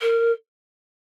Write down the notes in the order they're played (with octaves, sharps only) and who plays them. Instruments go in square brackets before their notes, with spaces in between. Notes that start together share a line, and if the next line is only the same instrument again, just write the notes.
[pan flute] A#4